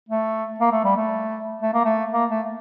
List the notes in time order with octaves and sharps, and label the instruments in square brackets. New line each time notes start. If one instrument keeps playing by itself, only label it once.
[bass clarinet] A3
A#3
A3
G3
A3
A3
A#3
A3
A#3
A3